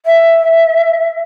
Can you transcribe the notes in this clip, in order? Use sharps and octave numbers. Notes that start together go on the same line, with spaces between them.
E5